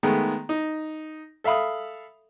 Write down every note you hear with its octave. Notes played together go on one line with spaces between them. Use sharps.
D#3 G#3 A3 B3
D#4
A4 E5 F5 B5 D#6